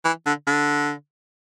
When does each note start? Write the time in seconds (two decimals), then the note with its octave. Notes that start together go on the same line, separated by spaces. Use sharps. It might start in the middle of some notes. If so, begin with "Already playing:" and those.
0.05 E3
0.26 D3
0.47 D3